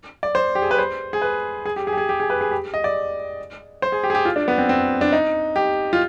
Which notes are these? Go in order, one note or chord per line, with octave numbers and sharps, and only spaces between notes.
D5
C5
G4
G#4
B4
C5
G#4
B4
G#4
G4
G#4
G4
G#4
G4
G#4
B4
G#4
G4
D#5
D5
C5
G#4
G4
G#4
G4
F4
D4
B3
C4
C4
D4
D#4
G4
F4